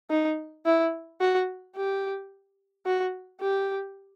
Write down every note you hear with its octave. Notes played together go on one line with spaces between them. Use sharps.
D#4
E4
F#4
G4
F#4
G4